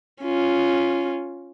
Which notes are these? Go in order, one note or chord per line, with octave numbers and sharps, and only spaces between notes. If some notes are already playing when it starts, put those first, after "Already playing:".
C#4 F4